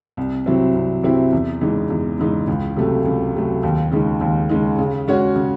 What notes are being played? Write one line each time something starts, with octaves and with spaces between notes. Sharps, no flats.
C2
C3 F#3 C4 E4
C2
C3 F#3 C4 E4
E2
C#3 E3 G#3 D#4
E2
C#3 E3 G#3 D#4
C#2
C3 F#3 A3
C#2
C3 F#3 A3
D#2
C#3 G#3 D#4
D#2
C#3 G#3 D#4
C#3
G#3 C#4 F#4 C#5
C#3